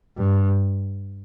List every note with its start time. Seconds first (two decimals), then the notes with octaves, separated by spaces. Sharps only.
0.17 G2